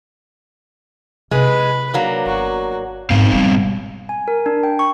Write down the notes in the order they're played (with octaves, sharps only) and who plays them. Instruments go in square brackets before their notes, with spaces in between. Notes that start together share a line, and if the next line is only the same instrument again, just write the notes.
[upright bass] C3 E4 [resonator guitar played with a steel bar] G#3 [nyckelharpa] B4 B5
[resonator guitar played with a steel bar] F#3 A#3 D4
[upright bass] G1 [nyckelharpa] F#4
[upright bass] G#2 [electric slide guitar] B2 C4 F5
[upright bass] G3 G#3
[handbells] G#5
A#4
D4
G5
C#6